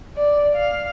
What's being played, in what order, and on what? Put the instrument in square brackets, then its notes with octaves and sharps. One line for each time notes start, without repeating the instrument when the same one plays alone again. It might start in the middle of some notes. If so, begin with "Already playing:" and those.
[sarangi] D5
F5